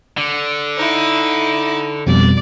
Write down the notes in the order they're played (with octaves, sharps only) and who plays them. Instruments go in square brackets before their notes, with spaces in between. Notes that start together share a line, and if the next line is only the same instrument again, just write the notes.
[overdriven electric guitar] D3
[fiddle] D#4 E4
[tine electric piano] F2 B2 G3 [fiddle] D5